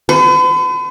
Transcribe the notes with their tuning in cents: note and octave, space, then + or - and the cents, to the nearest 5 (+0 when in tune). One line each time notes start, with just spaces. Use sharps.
B4 +45